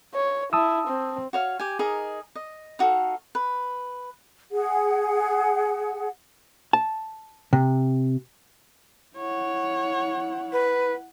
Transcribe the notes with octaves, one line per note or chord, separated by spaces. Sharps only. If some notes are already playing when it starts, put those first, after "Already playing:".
C#5
E4 A5 D#6 E6
C4
F#4 C#5 F5
G4 G#5
D#4 G#4 A#4 D#5
D#5
D#4 F#4 A4 F5
B4
G#4 F#5
A5
C3
E4 C#5 F#5
B4